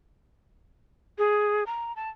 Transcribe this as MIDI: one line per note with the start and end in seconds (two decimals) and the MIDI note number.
1.18 1.64 68
1.66 1.95 82
1.96 2.09 81